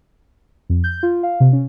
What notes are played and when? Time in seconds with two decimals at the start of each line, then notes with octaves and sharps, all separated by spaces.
0.70 F2
0.84 G6
1.03 F4
1.23 F5
1.40 C3
1.53 C#4